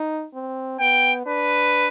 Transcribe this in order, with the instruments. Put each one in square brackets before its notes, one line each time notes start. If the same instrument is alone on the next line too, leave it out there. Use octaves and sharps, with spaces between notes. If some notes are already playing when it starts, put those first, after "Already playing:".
Already playing: [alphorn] D#4
C4
[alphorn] B3 [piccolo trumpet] G5
[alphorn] D4 [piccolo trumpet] B4